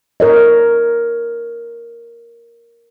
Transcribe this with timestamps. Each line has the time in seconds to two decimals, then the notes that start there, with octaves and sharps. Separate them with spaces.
0.20 A#4 C#5 D#5